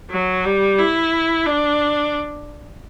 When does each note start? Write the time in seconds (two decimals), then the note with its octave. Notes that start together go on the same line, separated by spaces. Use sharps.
0.11 F#3
0.45 G3
0.78 E4
1.46 D4